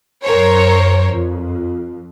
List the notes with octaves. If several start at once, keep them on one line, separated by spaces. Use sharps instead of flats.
F#2 A#4 C5 C#5
F2